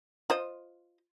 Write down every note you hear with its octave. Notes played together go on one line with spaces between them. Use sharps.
F4 C5 D#5